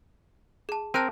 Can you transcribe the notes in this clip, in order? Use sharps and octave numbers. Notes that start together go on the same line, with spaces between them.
G#4 A5
C4 A#4 A5 F#6 D#7